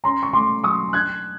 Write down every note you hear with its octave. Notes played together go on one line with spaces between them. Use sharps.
C#4 A#5 C6
C#6
A3 C6 D6
F#3 C#6 D#6
D4 F#6 G#6